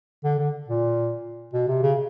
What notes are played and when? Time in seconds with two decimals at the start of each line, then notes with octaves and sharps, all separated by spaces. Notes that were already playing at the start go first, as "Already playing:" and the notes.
0.24 D3
0.39 D3
0.68 A#2
1.54 B2
1.68 C3
1.83 C#3